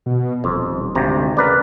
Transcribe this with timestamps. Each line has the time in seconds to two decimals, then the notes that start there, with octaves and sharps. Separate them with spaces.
0.06 B2
0.44 D#1 F2
0.95 G#1 D2 C3 A#5
1.37 C#3 A#4 B4 D5